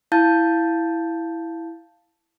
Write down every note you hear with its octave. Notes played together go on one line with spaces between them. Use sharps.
E4 F5 A5 G6 A6